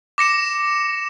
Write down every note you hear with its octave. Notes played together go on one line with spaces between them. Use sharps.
D6 A#6 C#7 E7